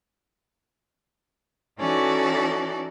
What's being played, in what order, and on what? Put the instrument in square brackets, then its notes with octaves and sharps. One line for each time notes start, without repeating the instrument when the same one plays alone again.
[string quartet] E3 C#4 D#4 F#4 A4 D5